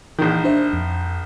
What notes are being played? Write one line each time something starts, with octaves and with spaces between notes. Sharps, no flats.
A#1 D#3 E3
D4 C5 E5
F2